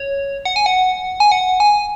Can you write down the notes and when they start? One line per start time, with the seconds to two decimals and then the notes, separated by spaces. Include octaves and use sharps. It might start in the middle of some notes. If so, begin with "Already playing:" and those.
Already playing: C#5
0.45 F#5
0.56 G#5
0.66 F#5
1.20 G#5
1.32 F#5
1.60 G#5